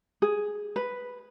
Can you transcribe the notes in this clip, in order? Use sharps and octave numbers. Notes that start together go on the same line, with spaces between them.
G#4
B4